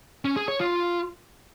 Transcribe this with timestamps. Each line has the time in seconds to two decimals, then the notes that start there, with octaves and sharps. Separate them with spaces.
0.25 C#4
0.36 G#4
0.48 C#5
0.60 F4